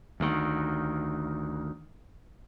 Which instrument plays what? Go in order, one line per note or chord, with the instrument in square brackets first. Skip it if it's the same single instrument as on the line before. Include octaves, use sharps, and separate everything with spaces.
[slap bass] D2 D#3